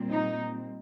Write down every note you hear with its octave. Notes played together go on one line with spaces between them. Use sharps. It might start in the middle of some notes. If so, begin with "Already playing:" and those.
Already playing: A#2 G3 C4
D#4